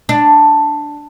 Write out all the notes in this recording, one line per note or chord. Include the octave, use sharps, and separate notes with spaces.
D4